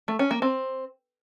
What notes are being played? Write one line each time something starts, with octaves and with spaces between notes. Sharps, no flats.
A3
C#4
A#3
C4